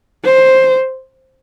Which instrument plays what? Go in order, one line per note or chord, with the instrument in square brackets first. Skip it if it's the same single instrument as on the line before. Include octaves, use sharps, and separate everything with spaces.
[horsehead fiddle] C5